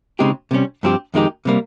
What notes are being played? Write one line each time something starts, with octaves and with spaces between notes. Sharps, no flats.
C#3 G#3 C4 D#4 G4
C3 G3 C#4
G2 F3 C4 G4
F2 D#3 G#3 D#4 G4
C3 G3 A#3